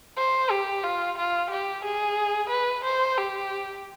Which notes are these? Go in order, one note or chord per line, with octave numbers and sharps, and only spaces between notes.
C5
G4
F4
F4
G4
G#4
B4
C5
G4